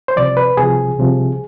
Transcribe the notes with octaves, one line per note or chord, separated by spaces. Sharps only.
C5
C2 C3 F3 D5
B4
C2 C3 F3 G#4
C2 C3 F3